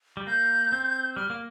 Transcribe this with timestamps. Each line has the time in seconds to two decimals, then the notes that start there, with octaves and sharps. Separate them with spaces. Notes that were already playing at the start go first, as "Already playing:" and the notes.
0.17 G3
0.27 A#3 G6
0.72 C4
1.16 G3 F6
1.30 A#3